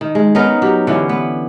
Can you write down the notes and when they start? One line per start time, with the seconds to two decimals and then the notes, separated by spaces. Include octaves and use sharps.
0.01 D#3
0.15 G#3
0.35 B3 C#4 D#4 A#4
0.62 F#3 G4
0.87 D3 E3 C#4
1.09 B3